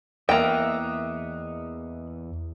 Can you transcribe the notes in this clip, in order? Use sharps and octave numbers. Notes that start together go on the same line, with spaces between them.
E2 A#3 D#5 E5 F#5 G5